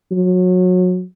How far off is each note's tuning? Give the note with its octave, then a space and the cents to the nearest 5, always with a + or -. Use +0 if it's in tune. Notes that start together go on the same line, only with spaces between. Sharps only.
F#3 -25